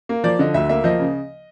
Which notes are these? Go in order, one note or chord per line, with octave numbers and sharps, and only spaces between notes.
A#3
F3 D5
D3 D#5
D2 E5
A#3 E5
F3 D#5
C#3